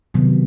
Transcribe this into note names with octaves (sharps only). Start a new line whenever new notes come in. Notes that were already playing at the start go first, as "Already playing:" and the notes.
C3 D#3 F#3 B3